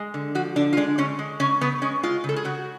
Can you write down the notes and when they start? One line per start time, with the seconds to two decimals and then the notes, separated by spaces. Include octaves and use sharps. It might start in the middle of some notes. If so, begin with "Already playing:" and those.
Already playing: G#3
0.14 D3
0.35 F3 F#4
0.56 D3 D4
0.73 F4
0.77 G#3 D4
0.98 D3 C#4
1.19 G#3
1.40 C#3 C#4
1.61 C#3 B3
1.82 G#3 C#4
2.03 G#3 F4
2.24 C#3 A4
2.36 G#4
2.44 C#3 F#4